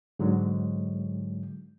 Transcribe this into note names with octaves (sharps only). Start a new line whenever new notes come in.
G#2 D3 F#3 G#3